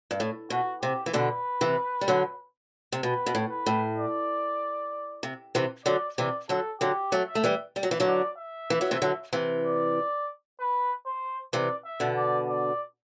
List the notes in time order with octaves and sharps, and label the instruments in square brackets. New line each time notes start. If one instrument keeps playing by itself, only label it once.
[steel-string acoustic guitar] G2
A2
[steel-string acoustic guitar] B2 [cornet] F#4
[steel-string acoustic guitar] C3 [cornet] G4
[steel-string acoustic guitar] E3
[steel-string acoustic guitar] B2 D3 [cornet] B4
[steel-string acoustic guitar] C3 E3
G3
D3 F#3
C3
[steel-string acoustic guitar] B2 [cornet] B4
[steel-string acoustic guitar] B2
A2
[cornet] B4
[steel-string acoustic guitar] A2
[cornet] D5
[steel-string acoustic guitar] C3
C3 E3
[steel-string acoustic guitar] D3 F#3 [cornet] D5
[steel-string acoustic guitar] C3 E3 [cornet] D5
[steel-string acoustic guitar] D3 F#3 [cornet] A4
[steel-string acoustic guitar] D3 F#3 [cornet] G4
[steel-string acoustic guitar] F#3 A3
[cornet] E5
[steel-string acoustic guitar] A3
E3 G3
G3
F#3
E3
D3 F#3
[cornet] D5
E5
[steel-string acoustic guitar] E3
F#3
C3 E3
D3 F#3
C3 E3
[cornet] D5
B4
C5
[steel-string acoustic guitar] C3 E3 [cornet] D5
[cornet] E5
[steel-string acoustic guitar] B2 D3
[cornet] D5
D5